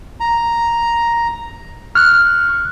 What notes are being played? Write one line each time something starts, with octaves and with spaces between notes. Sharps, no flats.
A#5
C#6 F6 F#6